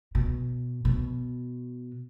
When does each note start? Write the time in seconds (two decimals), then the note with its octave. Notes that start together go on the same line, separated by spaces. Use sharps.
0.15 B2
0.85 B2